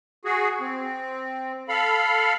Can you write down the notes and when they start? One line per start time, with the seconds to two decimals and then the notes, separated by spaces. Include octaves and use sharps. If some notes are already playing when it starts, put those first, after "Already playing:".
0.25 F#4 G#4
0.61 C4
1.69 A4 F5 B5